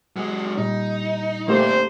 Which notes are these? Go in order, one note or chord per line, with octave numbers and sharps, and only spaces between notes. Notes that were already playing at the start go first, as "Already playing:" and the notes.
F#3 G#3
A#2 G3 D#4
A3 A#3 C4 D#4 G4 C5